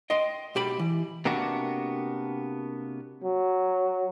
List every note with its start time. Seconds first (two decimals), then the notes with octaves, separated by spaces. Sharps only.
0.10 D#5 G5 C6
0.55 B1 G4 B5
0.79 E3
1.25 C3 A#3 B3 D4 F#4
3.24 F#3